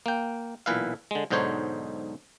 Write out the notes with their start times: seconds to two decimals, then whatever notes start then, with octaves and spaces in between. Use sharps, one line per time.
0.06 A#3 G5
0.66 B1 A#2 E3 B4 E5 F5
1.11 D3 G#3
1.31 B1 G#2 D3 D#4 C5 C#5